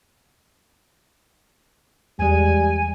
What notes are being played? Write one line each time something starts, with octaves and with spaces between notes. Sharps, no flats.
E2 G3 G#3 G#5